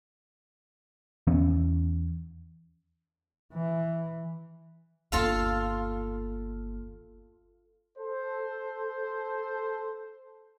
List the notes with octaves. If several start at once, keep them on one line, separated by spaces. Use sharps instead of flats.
E2 E3 B3 C#4
E3
G1 D#2 F4 A4 F5
A4 C5